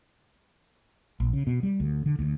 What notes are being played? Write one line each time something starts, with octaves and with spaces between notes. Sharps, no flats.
A#1
C#3
B2
G3
D2
D3
D2